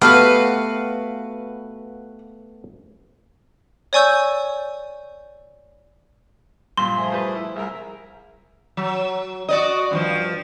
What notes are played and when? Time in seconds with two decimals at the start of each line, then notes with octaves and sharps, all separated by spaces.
0.02 A3 B3 F#4 G4 B4 F5
3.93 C#5 D5 G#5 C#6 E6 G6
6.77 G2 A#2 C6
6.94 F3 A3 G#4
7.12 G3 B4
7.35 E4
7.56 C2 G#4 A#4 E5
8.77 F#3
9.49 F#4 D5 D#5
9.91 G2 E3 F3